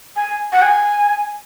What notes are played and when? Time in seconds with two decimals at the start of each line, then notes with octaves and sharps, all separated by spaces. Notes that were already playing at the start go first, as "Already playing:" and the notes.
0.16 G#5
0.52 F#5
0.62 G#5